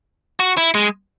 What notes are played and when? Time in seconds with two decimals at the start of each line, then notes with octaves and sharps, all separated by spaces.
0.40 F#4
0.57 E4
0.75 G#3